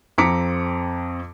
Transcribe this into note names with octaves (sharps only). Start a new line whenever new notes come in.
F2 C4 A#5 D6 B6 C#7